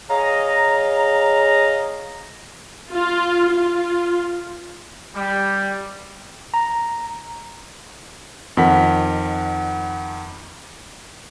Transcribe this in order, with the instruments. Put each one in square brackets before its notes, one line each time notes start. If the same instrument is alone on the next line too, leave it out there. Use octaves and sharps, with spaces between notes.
[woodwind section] G#4 C#5 D#5 F5 A#5
[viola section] F4
F4
[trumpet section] G3
[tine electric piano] A#5
[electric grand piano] F2 D#3 F#5 B6